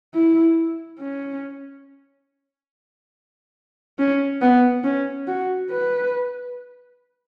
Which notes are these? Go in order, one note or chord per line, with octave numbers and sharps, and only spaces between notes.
E4
C#4
C#4
B3
C#4
F#4
B4